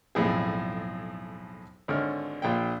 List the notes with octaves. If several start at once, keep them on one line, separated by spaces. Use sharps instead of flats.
B1 F2 A2 G#4
G#1 D3 C#5 F6
A#1 A#2 G5